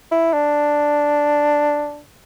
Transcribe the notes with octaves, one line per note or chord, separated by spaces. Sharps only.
E4
D4